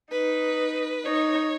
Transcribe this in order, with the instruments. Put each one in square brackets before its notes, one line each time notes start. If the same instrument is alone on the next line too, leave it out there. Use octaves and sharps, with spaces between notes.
[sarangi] D#4 [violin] B4
[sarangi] D#4 [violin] C#5